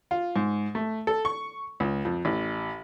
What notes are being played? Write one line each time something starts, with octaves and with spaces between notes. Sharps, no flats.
F4
G#2
A3
A4
C#6
C#2
F2
A1